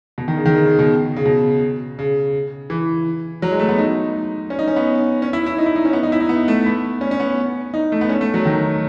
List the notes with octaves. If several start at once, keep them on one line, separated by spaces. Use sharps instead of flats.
B2
D#3
C#3
D#3
C#3
C#3
B2
C#3
B2
C#3
E3
F#3
G#3
A3
B3
D#4
C#4
D#4
C#4
B3
C#4
E4
E4
D#4
E4
D#4
C#4
B3
D#4
E4
D#4
B3
A3
B3
C#4
C#4
B3
D#4
A3
B3
C#4
A3
F#3
D#3